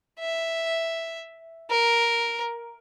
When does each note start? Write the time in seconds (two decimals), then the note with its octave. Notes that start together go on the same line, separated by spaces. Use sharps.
0.20 E5
1.70 A#4